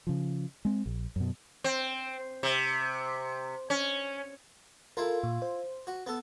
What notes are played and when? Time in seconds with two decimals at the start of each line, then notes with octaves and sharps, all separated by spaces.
0.07 C#3 F3
0.65 G#3 C4
0.86 A#1
1.16 F#2 B2
1.64 C4
2.43 C3
3.70 C#4
4.97 E4 F4 A4 A#4
5.23 A#2
5.42 C5
5.87 F#4
6.06 B3 A4